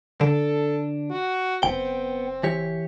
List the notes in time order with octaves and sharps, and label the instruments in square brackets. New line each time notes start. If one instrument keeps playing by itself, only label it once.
[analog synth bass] D3 [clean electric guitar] D4 [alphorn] A4
[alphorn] F#4
[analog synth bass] F#1 [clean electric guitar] B3 G5 [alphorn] C4
[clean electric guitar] E3 G4 C#5